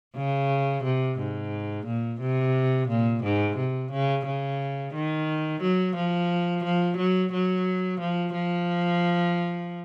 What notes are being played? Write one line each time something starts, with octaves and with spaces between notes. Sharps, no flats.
C#3
C3
G#2
A#2
C3
A#2
G#2
C3
C#3
C#3
D#3
F#3
F3
F3
F#3
F#3
F3
F3